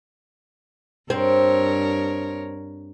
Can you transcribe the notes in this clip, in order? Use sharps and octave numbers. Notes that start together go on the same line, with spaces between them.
G2 C4 A#4 C#5